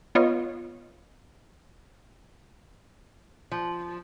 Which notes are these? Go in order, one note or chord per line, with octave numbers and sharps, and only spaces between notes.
B3 F4 C#5 D#5
F3